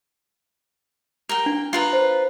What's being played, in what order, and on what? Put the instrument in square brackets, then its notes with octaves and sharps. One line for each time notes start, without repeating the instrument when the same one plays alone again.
[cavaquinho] A#4 G5
[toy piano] D4
[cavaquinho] F4 B4 A#5
[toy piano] C5